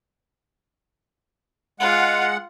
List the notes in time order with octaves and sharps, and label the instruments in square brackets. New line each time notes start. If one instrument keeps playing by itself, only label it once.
[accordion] G#3 F#5 [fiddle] F4